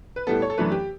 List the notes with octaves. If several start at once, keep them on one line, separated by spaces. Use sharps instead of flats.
B4
A2 G3 B3 A4
C#5
A4
F#2 E3 A3 D4 B4
G4